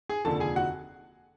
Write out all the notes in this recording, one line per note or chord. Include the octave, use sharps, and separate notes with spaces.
G#4 G#5
F1 D#2 D3 F3 A4 A5
G#4 G#5
F#4 F#5